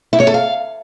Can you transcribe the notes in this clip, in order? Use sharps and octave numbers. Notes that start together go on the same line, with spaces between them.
E4
C#5
A4
F5